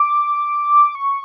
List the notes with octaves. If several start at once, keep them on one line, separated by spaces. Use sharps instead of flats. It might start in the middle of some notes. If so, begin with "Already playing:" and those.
Already playing: D6
C#6